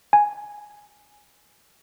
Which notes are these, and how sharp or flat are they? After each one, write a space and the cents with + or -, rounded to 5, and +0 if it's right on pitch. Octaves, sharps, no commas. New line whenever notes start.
G#5 +0